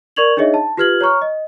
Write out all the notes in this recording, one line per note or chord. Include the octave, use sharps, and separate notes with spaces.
A#4 D5 C#6 G#6 F7 F#7
D4 D#4 G#4 C#5 D#5 E5
A5
F4 G4 B4 F6 G#6 F#7
C#5 A#5 C#6 F6
D#5